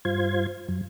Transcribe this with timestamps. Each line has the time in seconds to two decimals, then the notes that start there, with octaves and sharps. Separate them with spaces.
0.05 G2 F4 C5 G#6
0.68 F#2